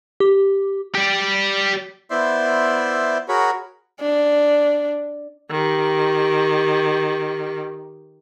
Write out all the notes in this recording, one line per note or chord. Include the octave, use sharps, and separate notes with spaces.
G4
G4 D5
B3 E4 C5 D5 E5 C6
F#4 G#4 A#4 C#5 B5
D4
D#3 G4